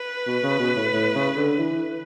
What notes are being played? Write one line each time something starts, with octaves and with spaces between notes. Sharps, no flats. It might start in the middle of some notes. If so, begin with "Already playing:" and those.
Already playing: B4
B2
C#3
B2
A2
A2
C#3
D3
E3